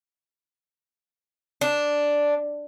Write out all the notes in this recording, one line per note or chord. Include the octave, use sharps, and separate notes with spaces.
D4